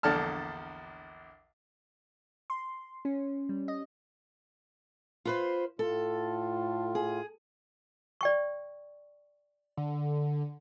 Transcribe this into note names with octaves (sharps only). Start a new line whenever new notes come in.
A#1 E2 D3 D5 A5 F6
C6
C#4
G3
D#5
F4 B4 C5
A2 F4 A4
G#4
D5 G5 C#6
D3